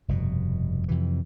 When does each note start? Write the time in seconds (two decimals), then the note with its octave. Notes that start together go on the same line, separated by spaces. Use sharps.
0.08 F1 G2 B2
0.88 F2 C3 E3